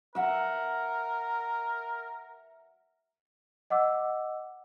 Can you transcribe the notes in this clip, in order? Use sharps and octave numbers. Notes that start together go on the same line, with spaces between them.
A#4 E5 F#5
D#5 F#5 D6 E6